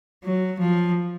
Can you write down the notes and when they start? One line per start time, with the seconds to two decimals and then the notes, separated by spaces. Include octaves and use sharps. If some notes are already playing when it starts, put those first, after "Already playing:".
0.24 F#3
0.59 F3